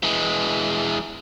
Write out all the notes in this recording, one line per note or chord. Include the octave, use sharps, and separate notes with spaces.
E3 G#3